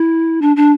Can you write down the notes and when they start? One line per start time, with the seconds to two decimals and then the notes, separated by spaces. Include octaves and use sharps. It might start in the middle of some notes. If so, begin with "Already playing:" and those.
Already playing: E4
0.42 D4
0.56 D4